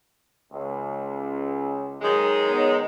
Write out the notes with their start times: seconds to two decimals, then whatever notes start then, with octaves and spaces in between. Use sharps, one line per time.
0.53 C#2
2.01 D#3 F#3 G#3
2.49 B3 D#4 C#5